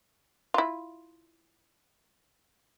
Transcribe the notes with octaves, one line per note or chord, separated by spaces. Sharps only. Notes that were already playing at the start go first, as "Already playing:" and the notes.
E4 F4